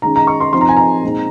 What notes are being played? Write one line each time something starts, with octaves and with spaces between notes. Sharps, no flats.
D#3 G#3 C#4 A#5
A#5
C#6
C6
F3 C4 D#4 C6
A#5
G#5
A#5
A#2 G#3 C4 D#4